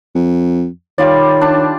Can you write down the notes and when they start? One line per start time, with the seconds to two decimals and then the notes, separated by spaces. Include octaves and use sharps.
0.15 F2
0.98 D#3 G3 F4 C#5 D5
1.41 D4 A5